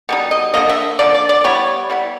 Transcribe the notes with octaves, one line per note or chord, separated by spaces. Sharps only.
B2 G3 D#4
D#5
D3 F3 A#3 D#5
E5
D3 F3 A#3 D5
D5
D5
G3 B3 E4 C#5
G3 B3 E4